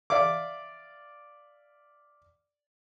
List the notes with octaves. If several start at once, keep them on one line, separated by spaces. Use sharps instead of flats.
D5 E5 F5 D6